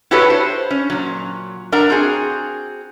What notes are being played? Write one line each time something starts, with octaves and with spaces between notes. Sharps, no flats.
E4 F#4 G4 A4 B4 C#5
C5
C#4
A#2 F#3
D4 A#4 F#5 A#5
C4 F#4 G#4